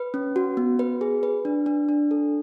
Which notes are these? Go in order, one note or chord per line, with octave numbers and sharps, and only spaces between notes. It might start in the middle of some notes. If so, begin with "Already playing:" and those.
Already playing: B4
C#4
F#4
B3
B4
G#4
B4
D4
D4
D4
A4